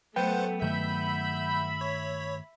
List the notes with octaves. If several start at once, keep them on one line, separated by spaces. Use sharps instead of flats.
F#3 A3 B3 B4 C5 F#5 G5
G2 D#3 A3 E5 B5 G6
C#5